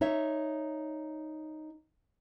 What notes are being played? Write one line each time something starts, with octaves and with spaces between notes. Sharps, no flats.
D#4 C#5 E5